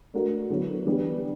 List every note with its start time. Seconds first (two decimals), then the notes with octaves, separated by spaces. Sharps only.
0.14 A3 D4 F#4 A#4
0.50 D3 F#3 B3 E4
0.86 E3 G3 B3 D4 G4